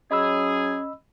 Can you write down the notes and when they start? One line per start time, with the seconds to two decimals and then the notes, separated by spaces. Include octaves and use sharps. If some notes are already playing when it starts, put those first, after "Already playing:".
0.11 F#3 C#4 G#4 D#5 B5 E6